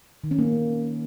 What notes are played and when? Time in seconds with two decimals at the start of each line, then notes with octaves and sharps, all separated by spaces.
0.24 D#3
0.31 C#4
0.39 A#3